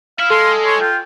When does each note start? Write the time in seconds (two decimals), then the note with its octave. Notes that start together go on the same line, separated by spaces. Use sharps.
0.19 E4 F5
0.31 G#3 A4 C6
0.65 C#5 C6
0.81 F4 G5